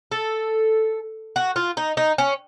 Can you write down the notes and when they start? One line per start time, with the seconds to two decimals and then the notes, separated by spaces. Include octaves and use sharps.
0.12 A4
1.36 F#4
1.56 F4
1.77 D#4
1.97 D#4
2.18 C#4